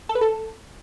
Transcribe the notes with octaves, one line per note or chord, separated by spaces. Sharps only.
A4
B4
A4